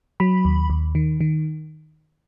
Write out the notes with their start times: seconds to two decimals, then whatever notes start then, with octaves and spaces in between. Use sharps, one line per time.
0.20 F#3 B5
0.45 D#2
0.70 D#2
0.95 D#3
1.21 D#3